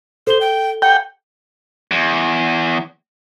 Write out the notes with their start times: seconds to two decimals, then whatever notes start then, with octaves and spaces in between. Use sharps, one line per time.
0.27 A4 C5 G7
0.41 G5
0.82 F#5 G5
1.91 E2